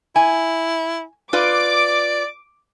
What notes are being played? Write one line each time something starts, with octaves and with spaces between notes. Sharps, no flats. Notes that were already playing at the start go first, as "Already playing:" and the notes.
E4 G#5
F4 B4 D5 D6